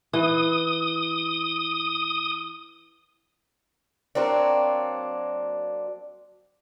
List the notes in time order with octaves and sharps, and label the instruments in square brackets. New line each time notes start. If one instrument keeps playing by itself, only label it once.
[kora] E3 [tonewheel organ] D#6
[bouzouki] F#3 A#3 C4 D4